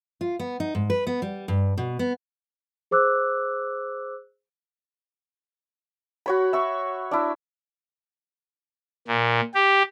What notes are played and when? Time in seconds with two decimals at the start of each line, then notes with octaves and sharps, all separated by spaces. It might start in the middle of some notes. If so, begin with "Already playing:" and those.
0.21 F4
0.39 B3
0.60 D#4
0.75 G#2
0.90 B4
1.07 B3
1.22 G3
1.48 G2
1.78 B2
1.99 B3
2.91 G#4 C5 D6 E6 F#6
6.26 F#4 C#5 B5
6.53 E5 C#6
7.11 D4 E4
9.08 A#2
9.54 G4